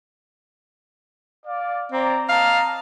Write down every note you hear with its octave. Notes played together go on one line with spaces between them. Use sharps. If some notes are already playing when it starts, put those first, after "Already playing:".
D5 F5
C4 D5 A#5
D#5 F5 A5 A#5